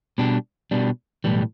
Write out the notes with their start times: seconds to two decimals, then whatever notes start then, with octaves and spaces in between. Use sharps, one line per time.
0.18 B2 G3 D4
0.71 B2 G3 D4
1.24 B1 A2 E3 G3